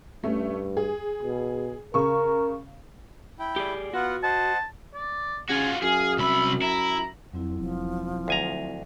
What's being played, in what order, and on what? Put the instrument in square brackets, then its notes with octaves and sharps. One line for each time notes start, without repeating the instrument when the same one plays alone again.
[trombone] G2 [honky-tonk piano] A3 C#4
[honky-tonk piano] G#4
[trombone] B2
[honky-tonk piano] C#3 C#6 [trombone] A#4
[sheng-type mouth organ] E4 G5
[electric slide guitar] G4 G#4 D5
[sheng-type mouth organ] B3 F4 F#5 [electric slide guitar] F#4
[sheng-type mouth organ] C5 D#5 F#5 [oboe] A5
[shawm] D5
[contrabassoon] C#3 [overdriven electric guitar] F4 F#4 [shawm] G#5
[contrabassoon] F#2 [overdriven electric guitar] G#4 [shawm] F5
[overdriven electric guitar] C2 B5 [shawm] E5
[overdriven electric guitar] E4 [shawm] A#5
[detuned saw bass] F2 [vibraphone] F#3 C4 E4
[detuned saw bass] E1 [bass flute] F3
[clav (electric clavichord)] D2 G#5 A#5